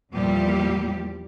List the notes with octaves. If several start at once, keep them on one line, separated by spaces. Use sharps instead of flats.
E2 A#2 F3 G3 G4